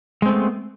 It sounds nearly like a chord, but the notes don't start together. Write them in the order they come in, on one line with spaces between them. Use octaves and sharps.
G#3 C4 A3 B3